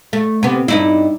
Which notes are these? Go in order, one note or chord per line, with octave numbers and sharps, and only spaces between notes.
A3
C3 B3
G2 D#4 E4